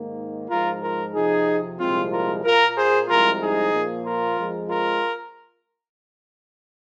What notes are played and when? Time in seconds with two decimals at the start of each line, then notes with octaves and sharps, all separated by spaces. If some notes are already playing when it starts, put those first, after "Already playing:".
Already playing: G#2 D#3 A#3
0.50 G#2 F3 G#3 F4 A#4
0.82 F4 A#4
1.14 F2 C3 F3 D#4 G#4
1.79 C2 A#2 F3 G#3 C4 F4
2.11 F4 A#4
2.44 A#2 A#3 F4 A#4
2.76 G#4 C5
3.08 C2 C3 F3 G#3 F4 A#4
3.40 D#4 G#4
3.72 A#2 F3 A#3
4.05 F4 A#4
4.37 F2 F3 G#3
4.69 F4 A#4